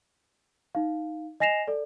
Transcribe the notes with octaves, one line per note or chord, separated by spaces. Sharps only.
D#4 F5
D#5 G#5 A#6 C7 E7 F7
A4 D5